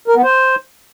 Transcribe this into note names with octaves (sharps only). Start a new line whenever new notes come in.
A#4
B3
C5